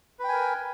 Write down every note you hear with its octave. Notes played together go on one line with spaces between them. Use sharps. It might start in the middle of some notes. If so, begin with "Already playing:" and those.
A#4 B4 G5 G#5